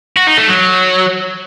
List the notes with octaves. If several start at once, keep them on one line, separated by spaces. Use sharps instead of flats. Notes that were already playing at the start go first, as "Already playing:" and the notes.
F#4
D#4
A3
F#3